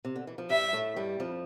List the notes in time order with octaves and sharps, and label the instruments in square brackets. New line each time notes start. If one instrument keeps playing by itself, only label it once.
[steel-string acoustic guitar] C3
D3
E3
F3
[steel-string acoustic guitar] G2 G3 [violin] E5
[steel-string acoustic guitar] A2 A3
G2 G3
F2 F3